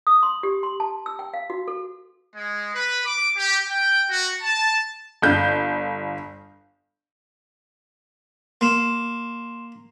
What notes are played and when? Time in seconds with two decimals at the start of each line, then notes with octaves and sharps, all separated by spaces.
0.07 D#6
0.23 C6
0.43 G4
0.63 C6
0.80 A5
1.06 E6
1.19 G5
1.34 F5
1.50 F#4
1.68 A4
2.34 G#3
2.75 B4
3.05 D6
3.36 G4
3.68 G5
4.10 F#4
4.42 A5
5.22 G1 G6
8.61 A#3 C6 E7